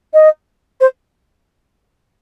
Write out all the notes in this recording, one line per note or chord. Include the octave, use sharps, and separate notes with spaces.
D#5
C5